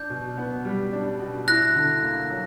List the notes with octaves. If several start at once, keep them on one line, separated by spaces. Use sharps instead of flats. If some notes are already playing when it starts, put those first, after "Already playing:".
Already playing: D4 G6
B2
B3
G3
D4
B2
E4 F#6 A#6
D3
A#3
F#3